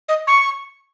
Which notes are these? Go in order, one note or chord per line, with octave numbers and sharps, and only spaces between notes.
D#5
C#6